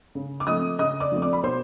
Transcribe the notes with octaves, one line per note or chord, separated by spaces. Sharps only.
C#3
D6
F3 A3 C4 D#5 D#6
C#3 D#5 D#6
D5 D6
F3 A3 C4
D5 D6
B5
B2 C5 C6